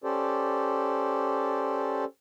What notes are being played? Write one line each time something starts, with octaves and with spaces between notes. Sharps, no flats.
C#4 G4 A4 C5 D5